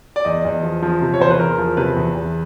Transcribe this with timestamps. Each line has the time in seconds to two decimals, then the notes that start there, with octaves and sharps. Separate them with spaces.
0.16 D5
0.25 E2 D#5
0.45 E2
0.63 F3
0.82 F3
1.01 C3
1.14 C#5
1.20 E2 C5
1.30 B4
1.39 E2 A#4
1.58 F3
1.77 C3 B4
1.97 E2
2.15 E2